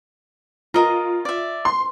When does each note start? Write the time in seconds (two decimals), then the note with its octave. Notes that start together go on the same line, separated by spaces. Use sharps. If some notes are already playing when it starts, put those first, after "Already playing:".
0.74 F4 A#4 D#5 A#5
1.25 D5 E5
1.65 C6